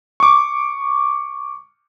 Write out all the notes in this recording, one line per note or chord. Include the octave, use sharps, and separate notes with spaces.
C#6 D6